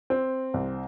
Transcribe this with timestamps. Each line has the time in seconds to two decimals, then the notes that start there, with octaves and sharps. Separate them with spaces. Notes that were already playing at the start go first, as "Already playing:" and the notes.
0.10 C4
0.54 C2